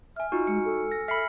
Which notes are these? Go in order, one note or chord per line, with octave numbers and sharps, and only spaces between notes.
E5 G#5 F6
D#4 F4 F#4
G#3 C#7
A4
A#6
E5 B5 F6 C7 C#7